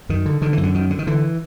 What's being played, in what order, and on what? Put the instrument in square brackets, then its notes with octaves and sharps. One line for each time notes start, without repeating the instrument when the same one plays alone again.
[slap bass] F#2 D#3
D3
D3 D#3
F#2 E3
D3
F#2 D#3
D3
D#3
D3 E3